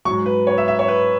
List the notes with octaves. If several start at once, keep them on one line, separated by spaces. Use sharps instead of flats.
F#3 C#6
G#2
B4
C#5
E5
E5
C#5
B4